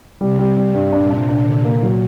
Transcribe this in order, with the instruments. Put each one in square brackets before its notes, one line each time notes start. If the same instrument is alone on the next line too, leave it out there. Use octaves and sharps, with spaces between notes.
[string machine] C3 [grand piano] G3
[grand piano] G3
G3
G2
[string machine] A#2 [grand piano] D4
[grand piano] D4
[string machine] C3 [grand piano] D4
[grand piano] D3
[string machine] A#2 [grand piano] A#3
[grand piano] F#3